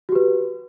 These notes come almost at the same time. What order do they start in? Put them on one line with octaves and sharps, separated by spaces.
F#4 G4 B4